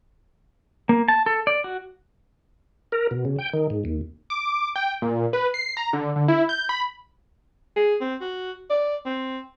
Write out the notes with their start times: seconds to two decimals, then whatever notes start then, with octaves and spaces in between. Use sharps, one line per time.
0.89 A#3
1.08 A5
1.26 A4
1.47 D5
1.64 F#4
2.92 A#4
3.11 B2
3.25 C#3
3.39 G5
3.53 D#3
3.70 G#2
3.85 D#2
4.30 D6
4.76 G5
5.02 A#2
5.33 B4
5.54 C7
5.77 A#5
5.93 D3
6.16 D3
6.28 E4
6.49 G6
6.69 B5
7.76 G#4
8.01 C4
8.21 F#4
8.70 D5
9.06 C4